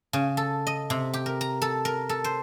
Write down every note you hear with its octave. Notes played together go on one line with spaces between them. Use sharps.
C#3
A4
D#5
C3
G4
A#4
A#5
A4
A#4
A4
C5